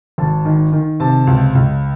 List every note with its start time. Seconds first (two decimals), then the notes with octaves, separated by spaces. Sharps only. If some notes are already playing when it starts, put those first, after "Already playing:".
0.18 G#1 A5
0.45 D#3
0.72 D#3
1.00 C3 A5
1.27 C#2
1.55 C#2